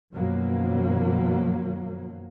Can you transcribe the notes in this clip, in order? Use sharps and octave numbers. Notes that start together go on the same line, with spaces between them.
F#2 B2 D#3 F3 F#3 A#3